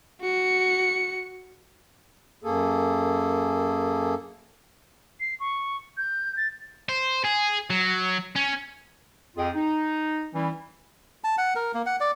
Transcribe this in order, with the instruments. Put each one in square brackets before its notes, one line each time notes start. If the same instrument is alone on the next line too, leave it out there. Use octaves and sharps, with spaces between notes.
[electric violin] F#4 C#7
[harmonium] F#2 A#3 G#4 A4
[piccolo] C7
C#6
G6
A6
[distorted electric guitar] C5
G#4
F#3
C#4
[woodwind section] F2 F4 G#4 D#5 G5
D#4
E3 G3 C#4 E4
[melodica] A5
F#5
A#4
A#3
F#5
D5